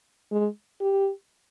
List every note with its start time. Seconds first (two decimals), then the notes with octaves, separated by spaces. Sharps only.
0.32 G#3
0.81 G4